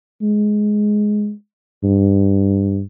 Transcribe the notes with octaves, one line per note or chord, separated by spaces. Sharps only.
G#3
G2